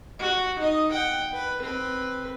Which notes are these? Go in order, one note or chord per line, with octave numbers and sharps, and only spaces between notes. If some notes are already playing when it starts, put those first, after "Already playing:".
F#4
D#4 D#5
F#5 G5
B4
C4 B4